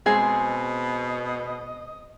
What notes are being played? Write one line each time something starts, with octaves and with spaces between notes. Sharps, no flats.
B2 G#3 C4 G#4 D#5